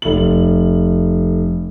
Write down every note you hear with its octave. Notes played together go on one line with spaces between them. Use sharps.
F1 F#7